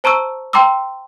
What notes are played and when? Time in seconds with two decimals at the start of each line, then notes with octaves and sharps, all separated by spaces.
0.04 C5 A5 A#5 C#6 E6
0.53 G5 A#5 C6 D6 E6